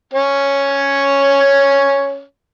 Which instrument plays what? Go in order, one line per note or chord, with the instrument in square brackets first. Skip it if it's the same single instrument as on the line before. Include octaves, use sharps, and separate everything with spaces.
[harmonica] C#4 C#5